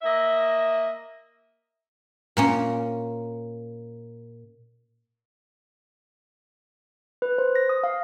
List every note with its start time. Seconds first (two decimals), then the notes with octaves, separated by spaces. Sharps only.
0.02 A#3 D#5 E5
2.37 A#2 A#3 C#4
7.22 B4
7.38 C5
7.55 A#6
7.69 D#6
7.84 F5